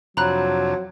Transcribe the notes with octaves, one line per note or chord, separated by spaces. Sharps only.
F2 C3 F#3 D4 A#5 B5 F#6